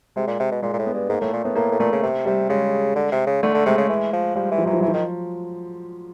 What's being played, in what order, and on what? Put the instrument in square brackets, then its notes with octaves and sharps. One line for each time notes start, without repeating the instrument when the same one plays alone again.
[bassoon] C3 [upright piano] G#3
[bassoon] A#2
C3
B2
[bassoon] A#2 [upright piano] G#3
[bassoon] A#2
A2
[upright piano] B3
[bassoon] G2
[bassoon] G#2 [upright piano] A#3
[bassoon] A2 [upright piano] A3
[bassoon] A#2
[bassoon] A2 [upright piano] B3
[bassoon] A2 [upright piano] A#3
[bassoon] A2
[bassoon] A#2 [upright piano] A3
[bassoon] C#3
C3
[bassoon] C3 [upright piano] G3
[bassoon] C#3 [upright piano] G#3
[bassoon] D3
C3
C#3
[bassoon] D3 [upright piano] A3
[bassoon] D3
[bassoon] C3 [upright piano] G#3
[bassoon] C#3
E3
F3
[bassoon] F3 [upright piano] G3
[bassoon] E3
[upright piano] F3
[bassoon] E3 [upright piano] F#3
[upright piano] F3
[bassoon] E3 [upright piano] F#3
[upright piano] F3
[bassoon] D#3 [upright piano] F#3